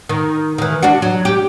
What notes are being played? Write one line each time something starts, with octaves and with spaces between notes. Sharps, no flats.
D#3
D#3 E3
D4 F#4
F#3
G4